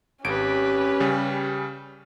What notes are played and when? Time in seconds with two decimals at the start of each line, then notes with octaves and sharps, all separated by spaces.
0.24 G#1 C#4 G4 B4 D7
1.00 C#3 G3